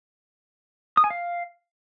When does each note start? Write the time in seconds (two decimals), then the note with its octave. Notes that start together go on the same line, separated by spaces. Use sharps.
0.97 D#6
1.04 G#5
1.10 F5